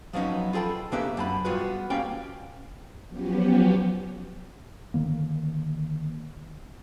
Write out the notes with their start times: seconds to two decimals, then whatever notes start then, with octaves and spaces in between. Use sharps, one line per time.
0.13 F3 F#3 B3 C#4 D#4
0.53 F4 G#4 A4 G5 B5
0.92 C#3 A#3 D4 G4 B4 E5
1.17 F#2 A5 B5
1.45 G3 B3 F4 F#4 G#4 B4
1.90 G3 A#3 C#4 F5 G5
3.08 F3 F#3 B3 C#4 G4
4.94 D3 D#3 A#3